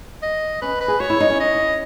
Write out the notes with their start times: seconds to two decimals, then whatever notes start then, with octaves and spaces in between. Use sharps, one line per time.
0.23 D#5
0.62 C#4 B4
0.81 B4
0.88 G#4
1.00 F#4 C#5
1.10 E4
1.20 D#4
1.30 C#4
1.40 D#5